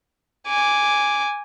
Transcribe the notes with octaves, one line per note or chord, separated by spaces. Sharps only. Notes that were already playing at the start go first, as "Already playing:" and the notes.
G#5 D6